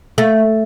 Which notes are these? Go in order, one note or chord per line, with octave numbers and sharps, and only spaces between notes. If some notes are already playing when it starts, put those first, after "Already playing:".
A3